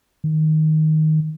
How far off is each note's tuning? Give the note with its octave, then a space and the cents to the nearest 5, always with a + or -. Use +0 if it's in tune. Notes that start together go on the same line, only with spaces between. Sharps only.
D#3 +5